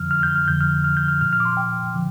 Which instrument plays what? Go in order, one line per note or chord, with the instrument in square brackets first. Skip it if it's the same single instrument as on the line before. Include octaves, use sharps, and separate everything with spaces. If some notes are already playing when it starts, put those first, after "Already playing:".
Already playing: [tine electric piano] F2 D3 F3 F6
F6
G6
F6
F2 D3 F3 G6
F6
F6
G6
F6
A#2 F3 F6
F6
D6
C6
G5
D3 F3